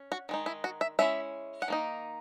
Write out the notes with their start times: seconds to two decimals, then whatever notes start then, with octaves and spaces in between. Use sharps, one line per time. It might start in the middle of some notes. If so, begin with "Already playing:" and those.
Already playing: C#4
0.12 F#4
0.29 D#3 G#3 D#4
0.46 E4
0.64 F#4
0.81 E5
0.99 G#3 C#4 E4 E5
1.62 F#5
1.68 D#3 A#3 D#4